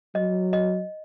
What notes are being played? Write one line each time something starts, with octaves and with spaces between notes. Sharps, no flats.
F#3 D#5
D#5